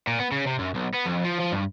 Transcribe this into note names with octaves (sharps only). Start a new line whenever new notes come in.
A#2
B3
C#3
C3
F#2
B1
B3
F2
F3
F3
G2